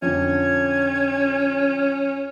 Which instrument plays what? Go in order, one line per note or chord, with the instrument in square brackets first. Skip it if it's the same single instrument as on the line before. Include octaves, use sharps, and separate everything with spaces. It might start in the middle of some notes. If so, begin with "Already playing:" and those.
[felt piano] F2 D3 [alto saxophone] C#4 [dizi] G#6